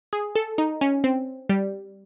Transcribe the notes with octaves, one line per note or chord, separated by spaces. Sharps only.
G#4
A4
D#4
C#4
C4
G3